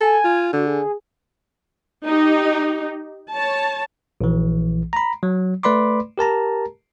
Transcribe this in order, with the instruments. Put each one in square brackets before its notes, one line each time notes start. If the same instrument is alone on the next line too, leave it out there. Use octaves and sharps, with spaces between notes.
[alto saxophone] A4 [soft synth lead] G#5
[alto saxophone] F4
[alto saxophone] D3 [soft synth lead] F#4
[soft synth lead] G#4
[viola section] D#4 G4
C#5 A5
[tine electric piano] A#1 E3
A#5 B5
F#3
A3 B4 D5 B5 C6 D6
G4 A#4 A5 A#5